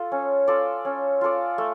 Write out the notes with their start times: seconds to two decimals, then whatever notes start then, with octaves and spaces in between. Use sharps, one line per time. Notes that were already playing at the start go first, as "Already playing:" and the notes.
Already playing: F4 A4
0.12 C#4
0.48 F4 A4 D5
0.85 C#4
1.21 F4 A4 D5
1.58 A3